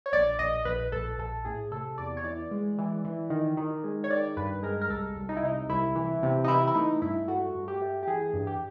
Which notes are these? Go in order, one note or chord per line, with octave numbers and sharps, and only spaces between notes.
C#5
A#1 D5
A#1 D#5
A#1 B4
A#1 A4
A#1 A4
A2 G#4
C3 A4
E2 D5
C#5
E3 D5
G#3
E3
E3
D#3
D#3
G#3
C#5
D#3 D5
G2 B4
G#3 A#4
A#4
C2 A4
C2
D#4
E4
C3 D#4
C2 E4
E3
C3
D#4
E3 E4
E4
A3 D#4
G2 E4
A3 F#4
G2
G4
A3
G4
E3 G#4
G2
G4